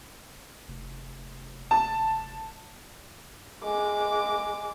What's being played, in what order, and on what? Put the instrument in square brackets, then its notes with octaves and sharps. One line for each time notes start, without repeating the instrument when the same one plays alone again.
[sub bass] F1
[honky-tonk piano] A5
[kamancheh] G#3 D6